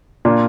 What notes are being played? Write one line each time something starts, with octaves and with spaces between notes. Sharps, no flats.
A#2 A#3 D4 F4